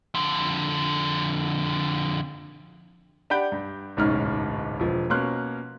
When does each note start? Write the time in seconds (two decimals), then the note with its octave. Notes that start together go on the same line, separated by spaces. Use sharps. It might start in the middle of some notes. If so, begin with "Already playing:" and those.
0.14 F2 D3
3.30 D4 G4 F#5 B5 G6 D7
3.52 G2
3.97 D1 B1 G#2 C#4 F6
4.80 E1 F3
5.10 B2 A#3 C#4 C6 F6 F#6